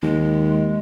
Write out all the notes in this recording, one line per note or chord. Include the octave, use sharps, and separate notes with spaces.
D#2 G#3